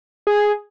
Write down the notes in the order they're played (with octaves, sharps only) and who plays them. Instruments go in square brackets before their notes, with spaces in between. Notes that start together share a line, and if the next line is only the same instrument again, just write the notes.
[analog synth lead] G#4